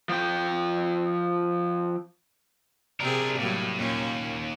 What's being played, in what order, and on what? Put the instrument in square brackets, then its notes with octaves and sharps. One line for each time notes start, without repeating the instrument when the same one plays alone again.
[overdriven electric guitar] F3 G5
[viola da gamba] C3 C4 G#4 [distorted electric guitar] D4 A#4
[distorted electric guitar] A2 [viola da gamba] F#3 G3 A#3
[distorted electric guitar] D#2 [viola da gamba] A#2 C#4